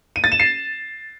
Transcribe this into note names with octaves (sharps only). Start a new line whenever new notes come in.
D#7
A6
E7
C7